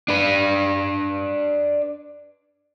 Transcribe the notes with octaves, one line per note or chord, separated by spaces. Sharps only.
D4 B4